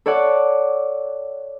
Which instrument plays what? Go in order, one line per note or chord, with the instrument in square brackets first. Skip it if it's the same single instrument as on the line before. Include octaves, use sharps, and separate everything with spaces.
[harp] A4 C#5 D5 F#5